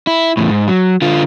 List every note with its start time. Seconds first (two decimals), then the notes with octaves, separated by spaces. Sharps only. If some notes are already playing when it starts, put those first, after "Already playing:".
0.07 E4
0.37 E2 A2
0.51 G#2
0.68 F#3
1.02 D3 F4